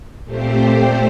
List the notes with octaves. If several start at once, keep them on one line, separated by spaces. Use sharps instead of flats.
A#2 A3 C4 G4 C5